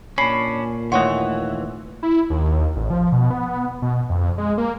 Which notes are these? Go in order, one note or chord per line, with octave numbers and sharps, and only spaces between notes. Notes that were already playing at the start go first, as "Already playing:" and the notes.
A#2 C#4 D4 B5 C7
D#2 E3 A3 C#5 F#5 C6 C#6
E4
D#2
A1
F3
B2
B3
B2
F2
G#3
A#3